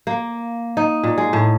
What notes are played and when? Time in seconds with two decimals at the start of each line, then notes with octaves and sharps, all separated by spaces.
0.07 A#3
0.77 D#4
1.04 A#2
1.18 G#3
1.33 A2